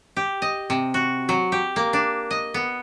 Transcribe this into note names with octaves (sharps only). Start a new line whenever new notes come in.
G4
D#5
C3
F#4
F#3
G4
A#3
D4
D#5
B3